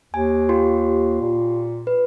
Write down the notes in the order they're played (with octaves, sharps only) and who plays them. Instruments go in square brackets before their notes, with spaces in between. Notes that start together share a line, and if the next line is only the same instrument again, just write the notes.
[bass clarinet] D#2 [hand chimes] G#5
[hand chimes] F4 G4 C6
[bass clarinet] A#2
[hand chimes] B4